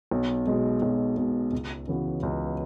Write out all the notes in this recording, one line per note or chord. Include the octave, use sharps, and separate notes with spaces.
B1
B2 G#3
B1
B2 G#3
C#2
C#3 E3 B3 F#4
C#2